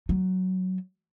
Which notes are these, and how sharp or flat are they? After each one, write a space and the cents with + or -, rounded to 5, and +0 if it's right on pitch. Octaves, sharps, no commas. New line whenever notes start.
F#3 +5